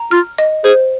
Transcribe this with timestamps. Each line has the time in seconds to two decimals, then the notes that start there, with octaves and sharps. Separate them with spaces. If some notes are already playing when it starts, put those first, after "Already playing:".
Already playing: A#5
0.11 F4 F6
0.38 D#5
0.64 G#4 C5